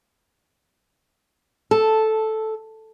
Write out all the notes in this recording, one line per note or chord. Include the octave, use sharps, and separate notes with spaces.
A4